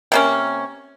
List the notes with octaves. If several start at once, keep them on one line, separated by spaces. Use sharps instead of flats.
C3 A#3 C#4